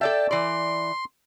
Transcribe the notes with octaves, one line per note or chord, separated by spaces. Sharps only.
A4 D5 E5 G5 A5
E3 D5 C6